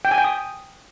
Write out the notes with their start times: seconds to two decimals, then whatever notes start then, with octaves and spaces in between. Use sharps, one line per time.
0.05 G5
0.11 G#5
0.18 G5
0.24 D#6